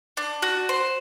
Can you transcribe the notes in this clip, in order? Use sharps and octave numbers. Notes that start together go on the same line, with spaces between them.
D4
F#4
C5